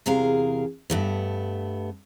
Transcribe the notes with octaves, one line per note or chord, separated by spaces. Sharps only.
E2 C3 G#4 A#4 F5
G2 A3 B3